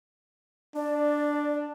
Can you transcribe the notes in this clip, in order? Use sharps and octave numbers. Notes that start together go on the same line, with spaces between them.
D4 D5